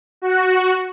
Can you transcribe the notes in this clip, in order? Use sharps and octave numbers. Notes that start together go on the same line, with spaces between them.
F#4